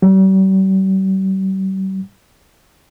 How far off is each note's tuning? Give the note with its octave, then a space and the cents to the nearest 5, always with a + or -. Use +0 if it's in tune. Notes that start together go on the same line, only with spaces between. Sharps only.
G3 -45